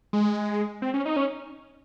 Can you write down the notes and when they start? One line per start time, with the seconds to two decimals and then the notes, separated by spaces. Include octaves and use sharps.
0.13 G#3
0.82 C4
0.94 C#4
1.05 D#4
1.17 C#4